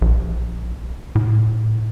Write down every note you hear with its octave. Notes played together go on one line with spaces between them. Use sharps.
A#1
A2